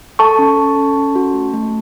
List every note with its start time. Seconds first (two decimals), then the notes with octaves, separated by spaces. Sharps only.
0.19 A4 A5 C#6
0.39 C#4
0.57 A4
0.76 C#4
0.96 C#4
1.15 F#4
1.34 A3
1.54 A3